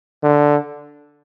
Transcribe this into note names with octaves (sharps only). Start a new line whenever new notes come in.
D3